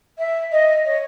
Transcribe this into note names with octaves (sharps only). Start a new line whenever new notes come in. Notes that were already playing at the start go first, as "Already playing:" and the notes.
E5
D#5
C#5